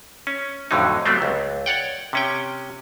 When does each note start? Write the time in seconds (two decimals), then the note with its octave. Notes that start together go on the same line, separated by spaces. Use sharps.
0.27 C#4
0.71 F2 A2 D3 F#3 D#4
1.06 F#3 G3 A3 B3 C4
1.22 C#2
1.66 C#5 D5 F#5 G5
2.13 C3 C#4 G5